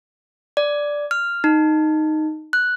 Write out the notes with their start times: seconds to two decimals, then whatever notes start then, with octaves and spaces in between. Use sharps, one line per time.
0.57 D5
1.11 F6
1.44 D#4
2.53 F#6